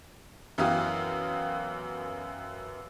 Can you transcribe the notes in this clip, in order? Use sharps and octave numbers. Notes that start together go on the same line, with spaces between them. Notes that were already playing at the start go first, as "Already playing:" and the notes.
F#2 E3 B3 G4 F5 D#6